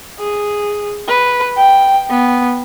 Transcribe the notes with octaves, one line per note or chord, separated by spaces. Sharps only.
G#4
B4
G5
B3